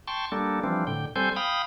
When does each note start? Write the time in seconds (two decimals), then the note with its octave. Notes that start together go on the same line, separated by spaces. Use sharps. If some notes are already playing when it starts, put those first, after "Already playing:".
0.08 G5 A5 C6 C#6
0.32 G3 A#3 D4 A4
0.64 E3 F3 G3 C4 D4
0.87 A2 D3 G5
1.16 G3 C4 A4 C5 G#5 G6
1.36 F5 G5 B5 D#6